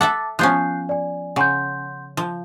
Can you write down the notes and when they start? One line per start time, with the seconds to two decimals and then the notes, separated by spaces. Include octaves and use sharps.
0.01 A4 E5 F#5 A5 D6 A6
0.39 F3 B3 C#4 F#6 G6 C7
0.89 D5 G#5
1.36 C#3 F#5 C6 G6
2.17 F3